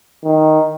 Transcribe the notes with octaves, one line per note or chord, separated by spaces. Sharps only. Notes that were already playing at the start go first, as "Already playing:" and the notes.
D#3